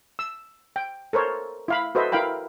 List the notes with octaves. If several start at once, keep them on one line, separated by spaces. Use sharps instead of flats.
E6
G5
A4 A#4 C5 C#5
E4 F5 B5
F#4 A4 B4 C5 D#5 E5
E4 A#4 F5 G5 B5